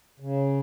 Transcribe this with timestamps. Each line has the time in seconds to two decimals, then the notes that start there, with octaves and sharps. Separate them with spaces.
0.20 C#3